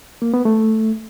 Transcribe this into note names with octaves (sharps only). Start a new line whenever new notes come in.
A#3
B3
A3